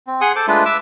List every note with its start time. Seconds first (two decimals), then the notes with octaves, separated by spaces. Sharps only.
0.07 C4
0.21 G#4 F#5 G#5 C6 D#6
0.36 A4 C5 D6
0.48 G#3 A3 D4 F4 B4
0.65 B4 E5 D6 E6